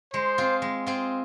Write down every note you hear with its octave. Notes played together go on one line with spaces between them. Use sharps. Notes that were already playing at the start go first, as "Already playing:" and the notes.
G#3 C5
C4 F4 G#4
G#3
C4 F4 G#4